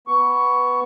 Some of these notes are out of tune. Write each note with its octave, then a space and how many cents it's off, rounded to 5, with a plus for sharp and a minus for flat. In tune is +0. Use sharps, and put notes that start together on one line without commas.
B3 +0 C#6 +15